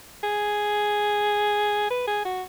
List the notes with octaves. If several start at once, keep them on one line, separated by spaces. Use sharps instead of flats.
G#4
B4
G#4
F#4